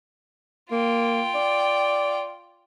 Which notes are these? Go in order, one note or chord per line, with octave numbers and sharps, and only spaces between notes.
A#3 F4 G5
D5